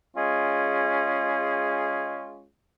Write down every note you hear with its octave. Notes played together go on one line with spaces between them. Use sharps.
G#3 C#4 F4 G#4